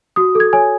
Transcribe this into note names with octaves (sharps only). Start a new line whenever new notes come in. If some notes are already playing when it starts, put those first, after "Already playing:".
F#4 D#6
A4
G#6
C#5 G#5